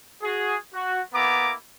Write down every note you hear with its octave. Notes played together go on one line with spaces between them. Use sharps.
F#4 G#4
F#4
A#3 B3 E4 A#5 D6